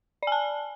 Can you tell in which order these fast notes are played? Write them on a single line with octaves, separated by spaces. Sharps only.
D5 G#5 A5